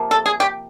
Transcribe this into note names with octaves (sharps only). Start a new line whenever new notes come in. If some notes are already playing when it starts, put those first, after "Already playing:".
Already playing: C3 F3 A#3
A4
G#4
G4